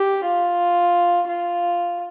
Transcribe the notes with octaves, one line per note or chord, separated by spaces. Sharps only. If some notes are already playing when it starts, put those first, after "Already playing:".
Already playing: G4
F4
F4